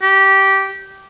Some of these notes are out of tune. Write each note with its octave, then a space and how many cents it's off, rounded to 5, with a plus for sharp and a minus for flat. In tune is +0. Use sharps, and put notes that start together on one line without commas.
G4 -15